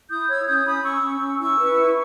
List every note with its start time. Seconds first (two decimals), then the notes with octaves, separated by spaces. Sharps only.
0.10 E4 D#6 G6
0.28 C#5 E6 G#6
0.47 C#4 D#6 G6
0.65 C#4 B5 D#6
0.84 C#4 C#6 E6
1.03 C#4
1.21 C#4
1.39 E4 C#6 E6
1.58 B4
1.77 E4